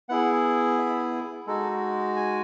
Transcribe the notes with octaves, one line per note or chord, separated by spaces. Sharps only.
B3 E4 G#4 F#5
E5
G#3 D#4 F#4 A4
G#5